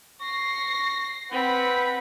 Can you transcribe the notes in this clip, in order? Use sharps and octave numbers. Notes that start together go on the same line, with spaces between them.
C#6 A#6 C7
C4 B4 F#5 B5